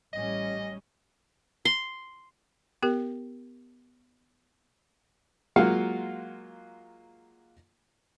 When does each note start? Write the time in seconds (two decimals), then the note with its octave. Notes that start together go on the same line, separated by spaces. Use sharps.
0.13 A1 G3 C#4 D#5
1.65 C6
2.82 B3 G4 A#4
5.56 F#3 G#3 A#3 F4 F5 F#5